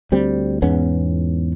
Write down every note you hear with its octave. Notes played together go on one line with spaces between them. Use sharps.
D2 G3 C4
E2 G#2 B3 C#4